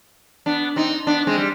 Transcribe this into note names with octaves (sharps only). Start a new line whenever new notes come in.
B3 D4
C4 D#4
B3 D4
G#3 C4
G3